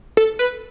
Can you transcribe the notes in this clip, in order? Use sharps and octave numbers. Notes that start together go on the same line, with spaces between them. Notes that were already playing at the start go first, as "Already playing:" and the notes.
A4
B4